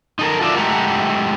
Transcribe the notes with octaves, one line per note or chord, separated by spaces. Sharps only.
D#4 A4 A#4
F4 F#4 A4 A#4 D5 E5
G#3 A3 E4 G4 F#5 A#5